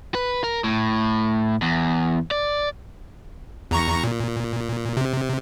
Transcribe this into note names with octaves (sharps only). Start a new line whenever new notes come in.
B4
A#4
A2
E2
D5
E2 A#5 C#6
A#2
C3